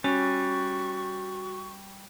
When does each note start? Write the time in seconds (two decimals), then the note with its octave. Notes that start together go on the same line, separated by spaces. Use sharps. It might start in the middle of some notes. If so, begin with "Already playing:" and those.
0.04 G3 C#4 F#4 C#6